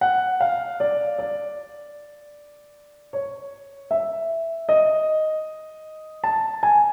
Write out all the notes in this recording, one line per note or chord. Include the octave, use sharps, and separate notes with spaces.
F#5
F5
D5
D5
C#5
E5
D#5
A5
G#5